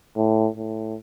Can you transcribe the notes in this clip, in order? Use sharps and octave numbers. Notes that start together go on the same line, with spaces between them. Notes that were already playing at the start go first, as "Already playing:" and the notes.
A2
A2